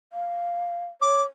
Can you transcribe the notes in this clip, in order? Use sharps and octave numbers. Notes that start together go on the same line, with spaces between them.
F5
C#5 D6